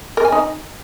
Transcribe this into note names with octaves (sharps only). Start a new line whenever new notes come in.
A#4
G#5
D#4